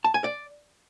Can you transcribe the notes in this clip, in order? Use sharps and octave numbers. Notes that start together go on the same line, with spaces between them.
A5
G#5
D5